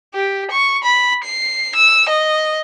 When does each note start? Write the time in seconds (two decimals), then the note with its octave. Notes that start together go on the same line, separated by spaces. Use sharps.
0.15 G4
0.51 C#6
0.83 B5
1.24 C7
1.76 E6
2.09 D#5